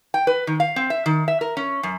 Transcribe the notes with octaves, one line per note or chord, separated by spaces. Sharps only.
G5
B4
D#3
F5
C4
E5
D#3
E5
A#4
C#4
F#2